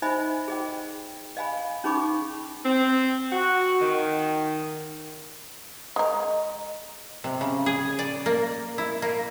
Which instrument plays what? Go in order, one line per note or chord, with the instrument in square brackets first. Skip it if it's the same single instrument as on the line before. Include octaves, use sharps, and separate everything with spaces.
[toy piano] D#4 C5 D#5 E5 G#5 B5
G#4 D#5 G5
D#5 F5 G#5 B5
C#4 D#4 G#4 B5 C#6 D6
[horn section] C4
F#4
D#3
[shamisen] G#3 A#4 [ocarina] D#5
[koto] C3
C#3
G#4
D5
A#3
E4
A#3